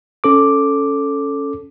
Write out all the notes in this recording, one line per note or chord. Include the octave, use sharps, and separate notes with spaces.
C#4 A4 D6